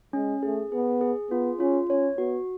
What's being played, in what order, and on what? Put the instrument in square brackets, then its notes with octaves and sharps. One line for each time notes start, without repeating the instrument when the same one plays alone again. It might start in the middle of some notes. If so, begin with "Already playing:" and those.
[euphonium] G#3 [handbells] C#4
[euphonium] A3 [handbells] G#4
[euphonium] B3 [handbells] G#4
[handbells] G#4
[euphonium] B3 [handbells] F4
[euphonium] C#4 [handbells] F4
[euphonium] C#4 [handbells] C#5
[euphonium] B3 [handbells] F#4